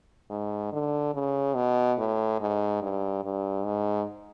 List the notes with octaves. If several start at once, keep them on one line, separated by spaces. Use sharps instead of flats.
G#2
D3
C#3
B2
A2
G#2
G2
G2
G#2